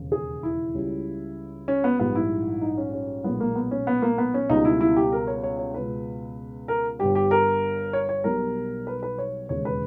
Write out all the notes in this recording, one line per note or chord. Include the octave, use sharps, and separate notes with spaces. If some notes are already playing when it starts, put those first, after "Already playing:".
Already playing: E1 D#2 C#3
G#4
E4
C#2 C#3 G3
C#4
B3
A#1 G#2 G3 B3
E4
D#4
C#4
C#4
B1 A#2 G#3 B3
A#3
B3
C#4
B3
A#3
B3
C#4
C#2 B2 G3 D#4
E4
E4
G4
A#4
C#5
C#5
C#5
C#2 B2 G#3 B4
A#4
G1 G2 G3 G4
G4
A#4
C#5
C#5
B1 B2 G3 A#4
B4
B4
C#5
E1 D#2 C#3 G#3 C#5
B4